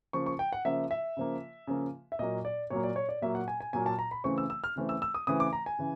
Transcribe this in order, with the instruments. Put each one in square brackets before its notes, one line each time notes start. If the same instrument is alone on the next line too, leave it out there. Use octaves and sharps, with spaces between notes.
[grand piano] C#3 F3 A#3 C#6
C#6
G5
F#5
C#3 F3 A#3 E5
E5
C#3 F3 A#3
C#3 F3 A#3
E5
A#2 F#3 A#3 D#5
D5
A#2 F#3 A#3 C#5
D5
C#5
D5
A#2 F#3 A#3 E5
F#5
G#5
G#5
A#2 F#3 A#3 G#5
A5
A#5
B5
C#3 E3 A3 C4 C#6
E6
E6
F6
C#3 E3 A3 C4
E6
E6
D#6
C#3 E3 A3 C4 D#6
D6
A#5
G#5
C#3 E3